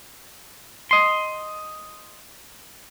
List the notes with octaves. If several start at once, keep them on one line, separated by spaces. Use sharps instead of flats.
D#5 C6